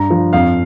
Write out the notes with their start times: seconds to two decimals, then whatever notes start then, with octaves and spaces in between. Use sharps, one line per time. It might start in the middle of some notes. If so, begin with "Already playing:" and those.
Already playing: G2 A#5
0.10 F3
0.33 F2 F5